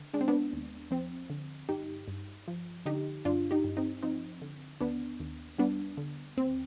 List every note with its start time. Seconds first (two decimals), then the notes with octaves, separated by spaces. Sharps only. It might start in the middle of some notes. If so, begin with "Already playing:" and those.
Already playing: D3
0.14 G#3 D4
0.21 C4
0.28 B3 D4
0.53 D#2
0.91 F3 C4
1.30 D3
1.69 G2 D#4 G4
2.08 G2
2.48 F3
2.86 D3 D#4 G4
3.25 G2 D4 F4
3.51 D#4 G4
3.64 G2
3.77 C4 D#4
4.03 F3 C4 D#4
4.42 D3
4.81 D#2 B3 D4
5.20 D#2
5.59 G3 B3 D4
5.97 D3
6.37 D#2 C4